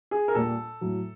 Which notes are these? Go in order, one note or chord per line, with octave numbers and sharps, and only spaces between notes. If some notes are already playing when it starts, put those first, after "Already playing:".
G#4
A#4
A#2 G3 A4
A2 F#3